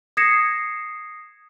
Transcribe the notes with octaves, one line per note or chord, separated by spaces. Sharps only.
D#6 G#6 A#6 C7 C#7 E7